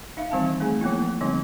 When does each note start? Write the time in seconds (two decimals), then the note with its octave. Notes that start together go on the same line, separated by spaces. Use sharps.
0.17 D#4 E5 F5
0.31 D#3 E3 G3 C4 F5 A5
0.60 A3 C4 D#4 G#4 G#5
0.81 F3 A#3 B3 E4
1.21 D3 F3 G3 C4 D#4